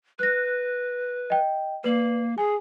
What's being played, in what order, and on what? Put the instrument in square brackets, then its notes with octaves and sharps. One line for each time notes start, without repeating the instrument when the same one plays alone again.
[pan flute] B4 [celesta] F#6 A#6
[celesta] D#5 G5
[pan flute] A#3 [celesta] B4 D5 F#7
[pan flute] G#4 [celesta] G#5